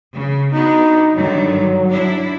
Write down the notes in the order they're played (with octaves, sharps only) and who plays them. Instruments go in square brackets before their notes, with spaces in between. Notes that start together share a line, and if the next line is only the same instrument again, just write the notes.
[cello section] C#3
[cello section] B3 D4 F#4 [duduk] D#4
[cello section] G2 D3 D#3 [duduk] F#3
[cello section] D4 E4